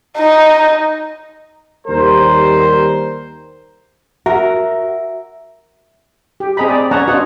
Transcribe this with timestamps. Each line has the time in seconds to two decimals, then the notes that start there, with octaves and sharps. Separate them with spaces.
0.17 D#4
1.87 D#2 G3 A#4 C5
4.26 F#4 A#4 E5
6.40 G4
6.57 C4 G#4 D#5 A#5 B5
6.69 D5
6.91 B3 C#4 C#5 F#5 A5 A#5
7.08 B3 D4 F4 F#4 D#5 F#5